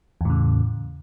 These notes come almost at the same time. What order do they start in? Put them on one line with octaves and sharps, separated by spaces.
E2 A2 C#3